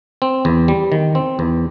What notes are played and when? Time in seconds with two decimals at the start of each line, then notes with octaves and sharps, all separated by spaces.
0.22 C4
0.45 E2
0.68 G3
0.92 D#3
1.15 C4
1.39 E2